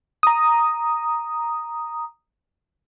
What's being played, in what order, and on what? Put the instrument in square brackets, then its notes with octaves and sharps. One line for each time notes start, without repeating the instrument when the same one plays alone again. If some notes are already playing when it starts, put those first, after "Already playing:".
[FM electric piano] A#5 D#6